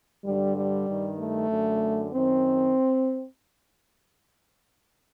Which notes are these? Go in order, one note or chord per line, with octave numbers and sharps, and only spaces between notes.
G2 D3 G3
G3
G2 D#3
A3
F#2 D3
F#2 D#3 C4